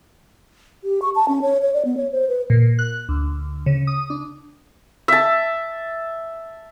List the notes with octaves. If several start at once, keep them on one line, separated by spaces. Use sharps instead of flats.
G4
C#6
A5
C#4
C#5
C#5
D5
B3
C#5
C5
B4
A#2
F#6
D2
C#3
D#6
D4
E5 A5